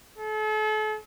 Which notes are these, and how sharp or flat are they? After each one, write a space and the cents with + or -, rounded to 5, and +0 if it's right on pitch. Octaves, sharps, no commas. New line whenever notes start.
A4 -40